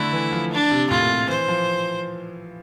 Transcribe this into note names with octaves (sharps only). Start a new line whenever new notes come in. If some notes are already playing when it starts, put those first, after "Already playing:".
Already playing: D3 A3 E4
E3
F3
D4
C3
A2 F4
A#2
C3
E3 C5
F3